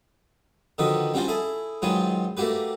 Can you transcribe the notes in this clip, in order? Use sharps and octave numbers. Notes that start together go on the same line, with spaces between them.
D3 D#3 F3 D#4 F#4 B4
G3 C#4 D4 F4 F#4 C5
E4 G#4 A4
G#2 D#3 F#3 F4 B4 G#5
A3 A#3 F#4 G4 B4